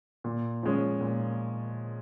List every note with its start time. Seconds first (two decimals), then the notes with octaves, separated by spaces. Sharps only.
0.24 A#2
0.63 F3 G#3 C#4
1.01 A#2